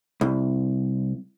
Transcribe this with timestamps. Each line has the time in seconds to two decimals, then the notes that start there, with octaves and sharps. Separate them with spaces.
0.21 C2